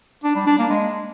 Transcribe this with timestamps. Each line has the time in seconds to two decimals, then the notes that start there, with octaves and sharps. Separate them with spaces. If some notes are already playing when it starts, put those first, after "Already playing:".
0.24 D4
0.36 G3
0.47 D4
0.59 A#3
0.70 G#3